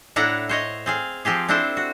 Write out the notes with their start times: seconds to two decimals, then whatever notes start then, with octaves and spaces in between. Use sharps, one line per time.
0.16 A2 D4 E4 A4 F#5 A#5
0.49 C5 C#5 D#5
0.86 C4 G#4 F5
1.25 F3 C4 G4 G#4
1.48 C4 D4 E4 A4 C5
1.77 F#4